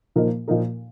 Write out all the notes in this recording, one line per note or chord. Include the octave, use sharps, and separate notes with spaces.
A#2 F3 A#3 D#4 A#4
A#2 F3 A#3 D#4 A#4